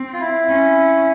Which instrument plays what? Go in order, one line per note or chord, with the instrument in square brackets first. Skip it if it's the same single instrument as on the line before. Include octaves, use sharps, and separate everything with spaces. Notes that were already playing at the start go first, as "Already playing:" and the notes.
Already playing: [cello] C4
[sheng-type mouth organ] F4
E4
[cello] C#4